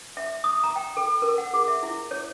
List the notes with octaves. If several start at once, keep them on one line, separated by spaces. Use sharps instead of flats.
E5
D#6
A#5
G5
A4
A#4
F#5
G#4
E5
E4
C#5